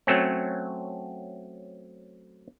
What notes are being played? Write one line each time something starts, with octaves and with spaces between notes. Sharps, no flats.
F#3 A3 C4 C#4